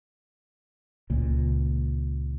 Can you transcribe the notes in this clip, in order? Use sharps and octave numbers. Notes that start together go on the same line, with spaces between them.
C#2 A#2